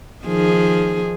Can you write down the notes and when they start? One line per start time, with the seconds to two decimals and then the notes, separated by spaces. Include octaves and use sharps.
0.25 D#3 F3 G#4